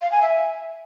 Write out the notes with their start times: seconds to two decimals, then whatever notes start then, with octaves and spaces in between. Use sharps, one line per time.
0.02 F5
0.12 G#5
0.22 E5